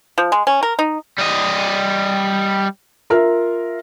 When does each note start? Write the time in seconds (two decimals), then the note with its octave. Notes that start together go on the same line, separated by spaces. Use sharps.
0.18 F3
0.32 G#3
0.47 C#4
0.63 A#4
0.79 D#4
1.18 G3 D#5
3.10 F4 A#4 E5 F6